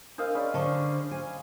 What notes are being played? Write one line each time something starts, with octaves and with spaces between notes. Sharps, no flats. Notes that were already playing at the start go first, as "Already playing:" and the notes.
D4 A#4 C5 D#5 F5
G#3 C#4 D5 B5
D3 D4 C5 G5 A5 C#6
G#5